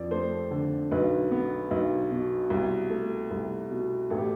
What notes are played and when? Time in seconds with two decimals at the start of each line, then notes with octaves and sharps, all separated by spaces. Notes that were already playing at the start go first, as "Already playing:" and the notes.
Already playing: F2 F3 D5
0.11 A3 C5
0.51 D3
0.91 B1 B4
1.31 B3
1.71 B1
2.11 B2
2.50 C2
2.90 A3
3.31 C2
3.71 B2
4.10 A1 A4
4.18 G4